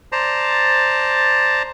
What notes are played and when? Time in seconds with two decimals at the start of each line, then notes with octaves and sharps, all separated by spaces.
0.12 C5 D5 A5 A#5